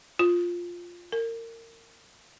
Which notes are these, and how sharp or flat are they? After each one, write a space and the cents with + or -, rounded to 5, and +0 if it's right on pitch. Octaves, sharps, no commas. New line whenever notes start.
F4 +0
A#4 -25